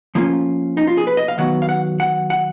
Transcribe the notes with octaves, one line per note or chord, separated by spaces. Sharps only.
F3 A#3 C#4 F4
D#4
F4
G#4
B4
D#5
F5
D#3 F#3 B3 F#5
F5
F#5
F#5
F#5